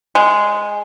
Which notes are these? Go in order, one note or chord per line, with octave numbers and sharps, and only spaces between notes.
G#3